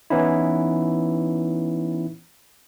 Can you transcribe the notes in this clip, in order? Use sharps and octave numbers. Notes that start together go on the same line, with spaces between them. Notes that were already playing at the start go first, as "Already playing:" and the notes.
E3 B3 C#4 D#4 E4